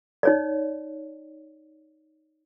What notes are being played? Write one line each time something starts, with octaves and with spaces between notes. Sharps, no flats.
D#4 C#5 D5